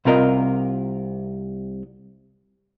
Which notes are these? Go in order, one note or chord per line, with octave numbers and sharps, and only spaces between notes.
C2 C3 F4 A#4 D#5